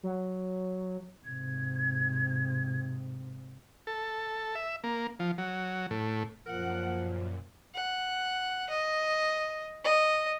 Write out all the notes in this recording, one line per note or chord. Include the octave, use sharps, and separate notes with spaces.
F#3
G#2 C3 G#6
A4
E5
A#3
F3
F#3
A2
F#2 A#2 F3 A#4 F#5
F#5
D#5
D#5